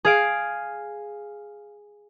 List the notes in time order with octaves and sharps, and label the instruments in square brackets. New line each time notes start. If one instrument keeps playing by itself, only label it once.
[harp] G#4 F5 D7